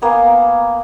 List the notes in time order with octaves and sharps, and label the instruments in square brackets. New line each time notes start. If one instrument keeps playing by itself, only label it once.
[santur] A#3 B3 G#5